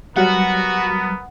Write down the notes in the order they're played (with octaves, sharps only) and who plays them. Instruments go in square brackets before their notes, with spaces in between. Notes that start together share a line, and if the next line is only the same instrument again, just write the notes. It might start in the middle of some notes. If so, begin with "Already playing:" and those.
[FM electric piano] F#3 G3 [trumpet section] B3 A#4 [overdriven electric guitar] F#4 [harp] F#5